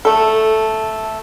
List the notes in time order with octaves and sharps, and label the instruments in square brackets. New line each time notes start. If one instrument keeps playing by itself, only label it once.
[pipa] A3 A4